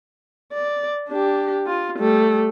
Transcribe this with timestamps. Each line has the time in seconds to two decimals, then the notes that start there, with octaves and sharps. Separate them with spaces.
0.53 D5
1.09 D4 G4
1.67 F4
1.99 G3 A3